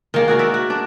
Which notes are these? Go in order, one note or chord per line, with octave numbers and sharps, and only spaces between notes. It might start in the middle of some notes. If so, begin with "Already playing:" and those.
D#3 A#3 G#4
F#4 G#4 A#4 C#5
D5 E5
F#4
D4 D5